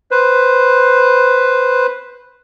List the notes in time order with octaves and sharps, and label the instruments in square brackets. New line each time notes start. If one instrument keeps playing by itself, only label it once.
[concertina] B4 C5